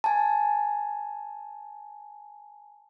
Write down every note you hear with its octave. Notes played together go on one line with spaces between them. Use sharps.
G#5 A5